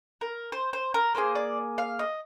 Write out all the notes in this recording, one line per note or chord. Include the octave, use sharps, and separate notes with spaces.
A#4
C5
C5
A#4
A#3 F4 G#4 C5
D5
F5
D#5